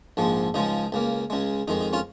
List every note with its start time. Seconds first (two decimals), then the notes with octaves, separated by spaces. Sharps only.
0.17 A#1 G#2 F3 G#3
0.54 C#2 C#3 F3 G#3 D#4
0.92 C#2 C#3 A#3
1.30 C#2 C#3 G#3
1.68 F2 D#3 G#3 D#4
1.81 D#4
1.93 C#4 F4